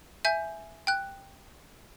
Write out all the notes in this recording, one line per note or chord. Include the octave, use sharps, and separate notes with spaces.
E5 G#5 G6
G5 F#6